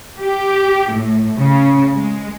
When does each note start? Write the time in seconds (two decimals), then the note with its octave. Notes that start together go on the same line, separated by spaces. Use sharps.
0.20 G4
0.92 A2
1.39 C#3
1.96 G#3